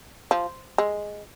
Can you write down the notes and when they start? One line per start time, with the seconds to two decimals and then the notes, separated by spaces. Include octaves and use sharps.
0.31 F3
0.78 G#3